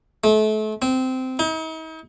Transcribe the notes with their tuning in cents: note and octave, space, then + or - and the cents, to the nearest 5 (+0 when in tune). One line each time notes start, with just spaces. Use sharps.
A3 -35
C4 -15
D#4 +45